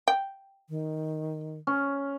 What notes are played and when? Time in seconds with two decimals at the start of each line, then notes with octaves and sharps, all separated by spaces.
0.08 G5
0.69 D#3
1.67 C#4